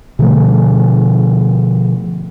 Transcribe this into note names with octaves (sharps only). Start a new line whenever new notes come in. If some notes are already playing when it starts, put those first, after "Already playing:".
B2 D3 F3 A3